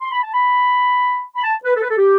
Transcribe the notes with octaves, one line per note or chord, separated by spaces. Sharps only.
C6
B5
A5
B5
B5
A5
B4
A4
B4
A4
G4